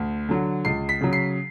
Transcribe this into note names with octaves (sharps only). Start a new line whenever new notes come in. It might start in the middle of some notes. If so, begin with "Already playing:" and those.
Already playing: D2
D3 F#3
C#2 C7
B6
C#3 F#3
C7